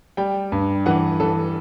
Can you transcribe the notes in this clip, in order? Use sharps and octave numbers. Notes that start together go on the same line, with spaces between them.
G3 G5
G2
E3 F#5
E3 A4